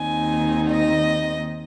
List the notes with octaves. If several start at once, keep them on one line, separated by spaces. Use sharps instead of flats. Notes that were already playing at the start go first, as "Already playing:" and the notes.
Already playing: D#2 D#3 C4 D#4 G#5
D#5